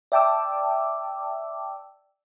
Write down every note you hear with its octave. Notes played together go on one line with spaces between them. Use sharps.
D5 E5 G5 A5 D6 E6